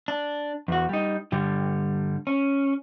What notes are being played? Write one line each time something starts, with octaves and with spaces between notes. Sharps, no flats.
D4
E2 F#4
G3 D#4
G2 D3 G3
C#4